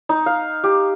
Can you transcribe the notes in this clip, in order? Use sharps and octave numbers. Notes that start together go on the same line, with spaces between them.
D#4
F5
G4